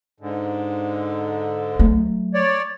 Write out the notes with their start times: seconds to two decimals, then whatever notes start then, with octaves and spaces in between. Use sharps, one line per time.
0.20 G#2 D3
1.79 F#3 A3
2.34 C#5 D5